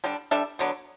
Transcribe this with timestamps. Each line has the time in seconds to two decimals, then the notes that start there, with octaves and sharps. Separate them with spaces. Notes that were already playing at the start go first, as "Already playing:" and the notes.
0.04 D3 G3 D4
0.31 G3 D4 A4 E5
0.59 D3 F#3 B3